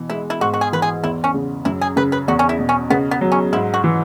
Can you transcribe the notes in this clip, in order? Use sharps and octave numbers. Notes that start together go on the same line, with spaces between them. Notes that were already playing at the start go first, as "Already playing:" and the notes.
Already playing: B2 E3
G#3 E4
E4
G#2 F#4
F#4
G#4
E3 B4
G#4
E2 E4
C#4
C#3
F#2 E4
G#4
C#3 B4
B4
E2 F#4
C#4
E4
B2
C#4
C#3 B3
B3
F#3
C#4
G#2 E4
F#4
E3